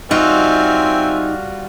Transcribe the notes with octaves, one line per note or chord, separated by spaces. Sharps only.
G3 C4 D#4 F4 F#4 E5 G#5